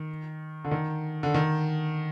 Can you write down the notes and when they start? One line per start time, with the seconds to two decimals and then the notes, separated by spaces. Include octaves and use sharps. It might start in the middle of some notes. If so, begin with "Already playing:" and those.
Already playing: D#3
0.64 D3
0.71 D#3
1.23 D3
1.34 D#3